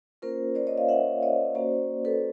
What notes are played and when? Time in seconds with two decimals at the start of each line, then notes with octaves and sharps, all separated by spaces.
0.22 A#3 C#4 F4 A#4 C5
0.55 C5 D5
0.67 C#5 D#5
0.78 D#5 F5
0.88 E5 F#5
1.22 C#5 D#5
1.55 A#3 C#4 F#4 C5 D5
2.05 A4 B4